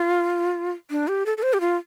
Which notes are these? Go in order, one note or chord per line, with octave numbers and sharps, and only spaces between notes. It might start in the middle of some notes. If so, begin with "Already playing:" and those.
Already playing: F4
D4
G4
A4
A4
C5
G4
F4